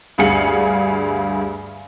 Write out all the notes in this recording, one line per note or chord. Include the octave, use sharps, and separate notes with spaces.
D2 G2 G#4 F5 C#7 F#7